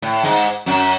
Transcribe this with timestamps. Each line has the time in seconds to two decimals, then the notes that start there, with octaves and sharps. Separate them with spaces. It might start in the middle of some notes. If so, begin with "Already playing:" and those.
0.02 A2
0.23 G#2 G#3
0.66 F#2 F#3